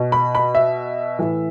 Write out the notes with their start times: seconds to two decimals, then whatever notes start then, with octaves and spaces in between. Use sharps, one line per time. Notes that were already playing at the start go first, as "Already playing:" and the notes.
Already playing: B2
0.12 B5
0.35 B5
0.55 E5
1.19 A2 E3